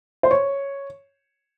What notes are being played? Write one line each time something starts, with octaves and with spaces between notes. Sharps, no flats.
C5
C#5